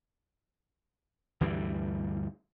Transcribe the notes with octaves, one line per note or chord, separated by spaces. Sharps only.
D2 G2 E3 G3